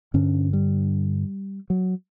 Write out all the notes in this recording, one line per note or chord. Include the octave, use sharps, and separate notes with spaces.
G2 D3 C#4
G3
F#3